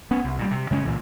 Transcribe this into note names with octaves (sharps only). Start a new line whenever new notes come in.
B3 C#4
C2
A#2 G3
C3
C#3 G#3 B3 C#4
C#2 A#2 E3